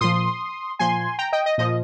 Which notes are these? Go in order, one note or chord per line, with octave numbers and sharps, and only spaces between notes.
A#2 F3 C6 D#6
A#2 F3 G#5 C6
G5 A#5
D#5 G5
D#5
A#2 F3 D#5